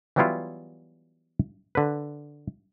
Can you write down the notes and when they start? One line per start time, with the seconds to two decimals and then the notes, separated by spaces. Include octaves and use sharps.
0.16 E3 F#3 G3 B3 E4 F4
1.75 D3 B4